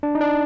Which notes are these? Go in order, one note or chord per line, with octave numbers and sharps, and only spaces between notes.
D4
D#4
D4